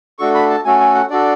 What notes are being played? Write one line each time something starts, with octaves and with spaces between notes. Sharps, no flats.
A3 D4 F#4 A4 C#6
B5
A5
A3 C#4 F#4 A4 G#5
G#5
F#5
D4 F#4 A4 D5